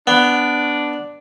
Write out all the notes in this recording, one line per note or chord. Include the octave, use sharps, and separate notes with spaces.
B3 D4